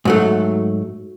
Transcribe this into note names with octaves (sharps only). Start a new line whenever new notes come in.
G#2 F#3 A3